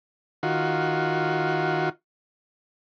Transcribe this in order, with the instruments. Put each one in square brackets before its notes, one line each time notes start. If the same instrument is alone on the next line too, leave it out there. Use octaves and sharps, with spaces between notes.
[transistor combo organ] D#3 F4 F#4